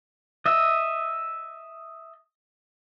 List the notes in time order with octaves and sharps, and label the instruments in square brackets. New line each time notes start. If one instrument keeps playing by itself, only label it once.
[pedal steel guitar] D#5 E5